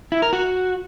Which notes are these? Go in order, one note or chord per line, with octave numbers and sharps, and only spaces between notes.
E4
A#4
F#4